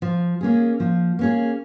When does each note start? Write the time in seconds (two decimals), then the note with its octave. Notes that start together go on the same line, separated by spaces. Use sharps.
0.02 F3
0.41 A#3 C#4 G#4
0.80 F3
1.19 A#3 C#4 G#4